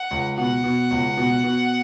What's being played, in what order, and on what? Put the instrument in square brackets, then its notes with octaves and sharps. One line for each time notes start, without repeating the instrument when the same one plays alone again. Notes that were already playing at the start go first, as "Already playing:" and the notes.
Already playing: [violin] F#5
[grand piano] C#2
[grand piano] B2 [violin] F#5
[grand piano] B2
C#2
B2
B2